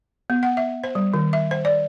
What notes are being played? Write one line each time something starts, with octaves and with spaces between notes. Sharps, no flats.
B3
F#5
E5
C5
G3
D#3
E5
C5
D5